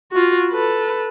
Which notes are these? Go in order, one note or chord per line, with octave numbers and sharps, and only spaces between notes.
F4 F#4
A4 B4